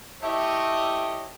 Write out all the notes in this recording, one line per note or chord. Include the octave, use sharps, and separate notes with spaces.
A3 E4 G4 C#5 D#5